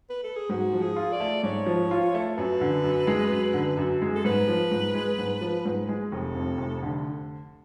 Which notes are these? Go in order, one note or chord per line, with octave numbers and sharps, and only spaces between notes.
B4
A4
G#4
G#2 F#4
F3
G#4
F4
D5
A3
G#2 C#5
F3
F4
A3
F#2 B4
D3
F#2
G#3
F#2
D3
F#2
G#3
A4
G#2 B4
F3
G#2
G#3
G#2
F3
G#2
G#3
F1 A4
F2
F1
D3